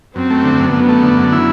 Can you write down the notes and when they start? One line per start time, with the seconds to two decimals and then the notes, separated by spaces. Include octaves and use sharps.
0.16 F#2 C4
0.30 A3
0.44 D3
0.59 F#2
0.74 F#2 B3
0.89 A3
1.03 D3
1.17 F#2
1.32 E4